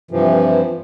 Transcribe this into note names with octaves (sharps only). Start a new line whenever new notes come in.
G2 C3 E3 F3